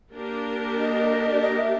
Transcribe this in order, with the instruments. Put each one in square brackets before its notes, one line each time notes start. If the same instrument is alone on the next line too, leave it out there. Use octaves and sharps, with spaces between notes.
[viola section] A#3 D4 G4 A#4
[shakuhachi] D#5
D5
D#5
E5